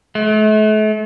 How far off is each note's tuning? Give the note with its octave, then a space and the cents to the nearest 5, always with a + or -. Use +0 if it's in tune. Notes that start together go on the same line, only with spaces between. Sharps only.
A3 -40